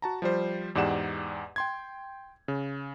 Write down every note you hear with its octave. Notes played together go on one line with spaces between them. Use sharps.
F#4 A5 A#5
F3 G3 C5
E2 G#2 G4 D5 F#5 E7
G5 C6 G#6
C#3